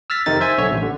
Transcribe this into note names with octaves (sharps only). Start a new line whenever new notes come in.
E6 F6 A6 B6
F2 C3 D#3 D#4 A6
C5 E5 G#5
B1 D3 C#5 E5
A1
D3